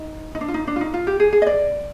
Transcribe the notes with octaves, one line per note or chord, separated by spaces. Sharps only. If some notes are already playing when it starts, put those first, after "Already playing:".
Already playing: D#4
D#4
D4
F4
D#4
D4
F4
D#4
F4
G4
G#4
G#4
D#5
D5